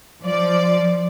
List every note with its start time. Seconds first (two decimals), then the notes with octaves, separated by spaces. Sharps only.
0.22 F3 D5